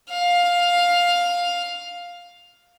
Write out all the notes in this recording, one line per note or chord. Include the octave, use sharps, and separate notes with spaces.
F5